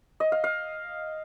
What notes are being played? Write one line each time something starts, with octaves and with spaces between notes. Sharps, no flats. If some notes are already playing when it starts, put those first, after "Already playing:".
D#5
F5
F5